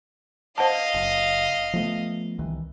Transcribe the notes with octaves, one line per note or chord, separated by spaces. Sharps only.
C5 D#5 F5 F#5 A5
F#1
F3 A3 B3
C2 D#3 E3